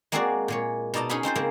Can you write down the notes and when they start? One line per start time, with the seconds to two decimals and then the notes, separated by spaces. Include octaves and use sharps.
0.12 G#3 A#3 C4 F#4 G#4 D5
0.48 A#2 G#3 C#5
0.94 B2 D#4 D5 D#5 A5 A#5
1.09 C#4 D#4 G#4 F5 G#5 B5
1.23 C4 D#4 F4 C5
1.36 C#3 G#3 A#3 C4